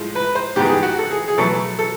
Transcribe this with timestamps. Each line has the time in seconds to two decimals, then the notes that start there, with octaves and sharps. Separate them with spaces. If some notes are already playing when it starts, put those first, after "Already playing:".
Already playing: A2 F3 G#3
0.15 B4
0.35 C5
0.56 G#2 D#3 G#3 B3 G4
0.65 G#4
0.74 G4
0.83 F#4
0.99 A4
1.10 G#4
1.28 G#4
1.38 B2 F#3 A3 A4
1.79 A4